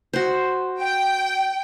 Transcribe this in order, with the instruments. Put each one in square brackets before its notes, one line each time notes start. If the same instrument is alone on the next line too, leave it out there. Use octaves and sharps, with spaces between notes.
[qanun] F#4 C5
[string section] G5